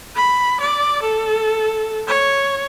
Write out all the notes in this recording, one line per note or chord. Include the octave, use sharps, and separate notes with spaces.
B5
D5
A4
C#5